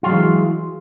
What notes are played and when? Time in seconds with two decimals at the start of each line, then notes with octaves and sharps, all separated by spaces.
0.03 F4
0.06 F#3
0.09 G#3
0.12 E3